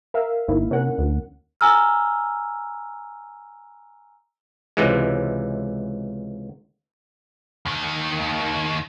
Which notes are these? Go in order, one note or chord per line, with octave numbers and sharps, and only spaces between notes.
A#4 E5 F5
G1 A#3 D#4 E4
C3 C#4 A#4 F#5
D2
G#5 A#5 E6 F6
C#2 C3 E3 G#3
D#2 D#3